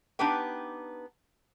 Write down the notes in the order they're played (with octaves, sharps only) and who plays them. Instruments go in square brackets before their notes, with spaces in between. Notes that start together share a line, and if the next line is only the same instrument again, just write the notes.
[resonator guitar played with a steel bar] B3 D4 D#4 G4 B4 G5